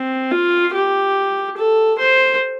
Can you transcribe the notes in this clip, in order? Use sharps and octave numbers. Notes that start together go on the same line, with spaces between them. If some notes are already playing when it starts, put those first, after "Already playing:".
Already playing: C4
F4
G4
A4
C5